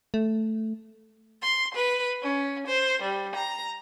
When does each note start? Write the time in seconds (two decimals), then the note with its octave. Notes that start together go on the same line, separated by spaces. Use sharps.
0.14 A3
1.42 C6
1.75 B4
2.23 C#4
2.67 C5
3.02 G3
3.35 A#5